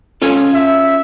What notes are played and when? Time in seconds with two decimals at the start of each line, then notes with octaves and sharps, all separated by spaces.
0.22 C#4 F4 A4
0.54 E5